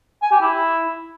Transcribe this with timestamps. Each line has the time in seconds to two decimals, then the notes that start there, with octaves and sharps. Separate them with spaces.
0.22 G#5
0.31 G4
0.41 E4